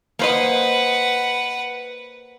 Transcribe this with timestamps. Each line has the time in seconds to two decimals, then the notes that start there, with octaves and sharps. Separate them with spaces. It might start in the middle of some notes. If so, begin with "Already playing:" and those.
0.19 A#3 B4 C5 D#5 F#5